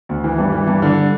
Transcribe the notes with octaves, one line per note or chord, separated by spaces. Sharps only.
D2
E3
G2
E3
G2
D3